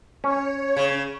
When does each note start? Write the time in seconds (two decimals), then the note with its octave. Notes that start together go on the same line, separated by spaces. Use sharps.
0.24 C#4 C#5
0.76 C#3